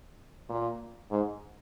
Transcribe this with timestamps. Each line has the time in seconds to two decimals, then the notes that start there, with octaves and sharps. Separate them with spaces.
0.49 A#2
1.11 G#2